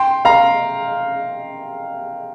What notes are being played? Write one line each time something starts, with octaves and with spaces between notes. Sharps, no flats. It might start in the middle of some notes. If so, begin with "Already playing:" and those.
Already playing: G5 C6
F5 A#5